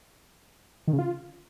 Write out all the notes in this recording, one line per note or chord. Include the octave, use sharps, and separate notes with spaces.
D#3
C#3
F4